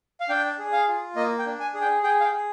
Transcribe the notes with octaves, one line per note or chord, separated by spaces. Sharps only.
F5
D4 G5
G#4
F5
F4
A#3 D#5
G5
D4
G#5
G#4
G5
G#4 G5
F5
G5
G#4